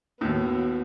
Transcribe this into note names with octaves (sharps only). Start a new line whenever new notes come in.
D#2 A2 B3 F#4